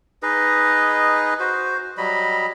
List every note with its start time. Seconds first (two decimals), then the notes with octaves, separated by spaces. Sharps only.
0.23 D#4 G#4 B4 D#5
1.40 F#4 C5
1.98 F#3 G3 D#5 B5